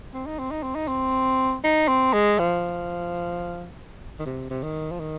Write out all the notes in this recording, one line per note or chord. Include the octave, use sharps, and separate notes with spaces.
C4
D#4
C4
D#4
C4
D#4
C4
D#4
C4
G#3
F3
D#3
C3
C3
D#3
F3
D#3